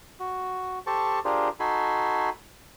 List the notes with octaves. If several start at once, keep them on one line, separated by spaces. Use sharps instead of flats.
F#4
G4 A4 C5 A5 C#6
D4 F4 G4 G#4 A#4 C5
D#4 F#4 A4 G#5 B5 C6